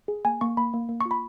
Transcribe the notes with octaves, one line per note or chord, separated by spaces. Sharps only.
G#4
A#3 G#5
A#3 C#6
A#3 B5
A#3
A#3
F4 C#6
B5